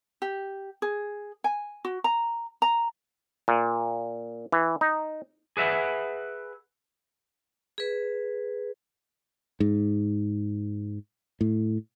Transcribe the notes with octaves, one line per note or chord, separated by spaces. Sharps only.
G4
G#4
G#5
F#4
A#5
A#5
A#2
E3
D#4
G#4 B4 E5 F#5
G#4 B4
G#2
A2